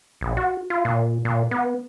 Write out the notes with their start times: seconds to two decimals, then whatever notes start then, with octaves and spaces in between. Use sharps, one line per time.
0.21 A#1
0.37 F#4
0.70 F4
0.85 A#2
1.25 A#2
1.51 B3